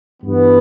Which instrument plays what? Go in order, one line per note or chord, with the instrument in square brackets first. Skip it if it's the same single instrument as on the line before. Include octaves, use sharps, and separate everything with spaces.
[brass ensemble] G2 E3 B3